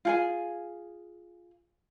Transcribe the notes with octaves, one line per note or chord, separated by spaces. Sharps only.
F4 G#4 G#5